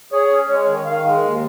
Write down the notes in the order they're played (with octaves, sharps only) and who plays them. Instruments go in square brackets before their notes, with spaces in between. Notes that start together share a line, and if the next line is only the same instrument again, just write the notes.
[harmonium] G#4 [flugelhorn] C#5
[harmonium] C#4
[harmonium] G#3 [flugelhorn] C#5
[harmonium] D#3
[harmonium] D#3 [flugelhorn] F5
[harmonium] G#3
D#2